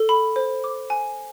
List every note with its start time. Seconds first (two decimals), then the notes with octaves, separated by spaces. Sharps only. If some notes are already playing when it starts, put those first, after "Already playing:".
Already playing: A4
0.09 B5
0.36 C5
0.64 D6
0.90 G#5